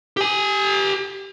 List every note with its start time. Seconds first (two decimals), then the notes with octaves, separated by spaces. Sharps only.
0.17 G4 G#5